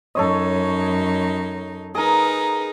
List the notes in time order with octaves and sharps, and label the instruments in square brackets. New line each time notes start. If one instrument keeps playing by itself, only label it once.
[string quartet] F#2 D#4 [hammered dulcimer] A4 C#5 D#5
[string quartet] D#4 B4 [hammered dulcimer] G#4 A#4